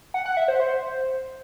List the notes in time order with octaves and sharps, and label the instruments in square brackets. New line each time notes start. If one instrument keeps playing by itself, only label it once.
[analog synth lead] F#5
F#5
E5
C5
C5